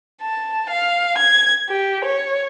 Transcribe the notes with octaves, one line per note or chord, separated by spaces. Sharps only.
A5
F5
G#6
G4
C#5